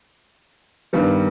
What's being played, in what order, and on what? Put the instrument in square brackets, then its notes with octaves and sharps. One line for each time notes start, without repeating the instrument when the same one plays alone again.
[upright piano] G2 D#3 G3 B3